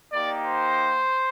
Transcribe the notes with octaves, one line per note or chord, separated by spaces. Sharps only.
A#3 D#4 G4 D5
C5